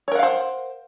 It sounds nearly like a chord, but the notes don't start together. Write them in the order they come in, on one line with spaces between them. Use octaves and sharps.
C#5 A#4 F#5 F5 C5